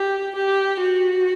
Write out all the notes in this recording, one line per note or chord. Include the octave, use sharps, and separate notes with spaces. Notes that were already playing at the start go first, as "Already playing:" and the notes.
Already playing: G4
G4
F#4